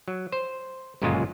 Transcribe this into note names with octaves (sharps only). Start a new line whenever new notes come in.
F#3
C5
G1 F#2 A#2 C#3 G#3 F4